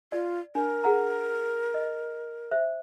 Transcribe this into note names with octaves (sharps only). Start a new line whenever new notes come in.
F4 D5
D4 A#4
G#4 F#5 A#5
D#5
C5 E5